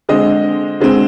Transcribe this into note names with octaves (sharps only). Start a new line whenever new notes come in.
D3 G#3 C4 D#5
D3 G#3 C4